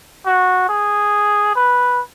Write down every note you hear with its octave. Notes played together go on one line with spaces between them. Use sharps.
F#4
G#4
B4